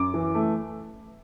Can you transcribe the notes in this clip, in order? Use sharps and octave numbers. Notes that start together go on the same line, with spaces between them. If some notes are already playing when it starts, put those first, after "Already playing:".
Already playing: F#2 D6
E3
A3